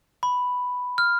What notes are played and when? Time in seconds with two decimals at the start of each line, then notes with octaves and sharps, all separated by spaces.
0.23 B5
0.98 F6